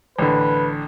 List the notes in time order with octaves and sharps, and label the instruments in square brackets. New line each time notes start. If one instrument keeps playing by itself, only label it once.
[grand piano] A1 D3 [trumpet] B4